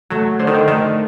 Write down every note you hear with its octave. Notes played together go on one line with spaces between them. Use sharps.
F#3 A3
D3 C5
D#3
D3
D#3 A3